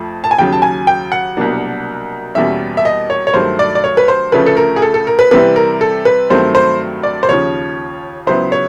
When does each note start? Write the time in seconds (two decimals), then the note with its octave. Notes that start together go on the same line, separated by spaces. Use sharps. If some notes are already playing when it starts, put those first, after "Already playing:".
Already playing: F2 F3 A3
0.24 A5
0.31 G#5
0.39 D#2 C#3 F#3 G5
0.52 A5
0.62 G#5
0.87 G5
1.12 F#5
1.37 C2 B2 F#3 A#3 D4
2.35 E2 B2 G3 A#3 C#4 E5
2.77 E5
2.85 D#5
3.10 C#5
3.27 C#5
3.34 G2 D#3 F#3 A3 C5
3.59 D5
3.75 D5
3.84 C#5
3.97 B4
4.08 C5
4.32 D2 C#3 F3 A3 C#4 B4
4.46 A4
4.57 A#4
4.76 G#4
4.82 A4
4.94 A4
5.07 A#4
5.19 B4
5.31 C3 E3 G3 C4 E4 B4
5.56 A#4
5.81 A4
6.05 B4
6.30 G2 D#3 F#3 A3 C4 C5
6.55 C5
7.03 D5
7.23 C5
7.29 D#2 C#3 F3 C#5
8.27 C#2 C#3 F#3 B3 E4 C5
8.52 C#5